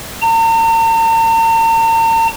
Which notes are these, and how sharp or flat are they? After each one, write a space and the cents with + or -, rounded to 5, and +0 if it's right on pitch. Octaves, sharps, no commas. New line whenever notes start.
A#5 -45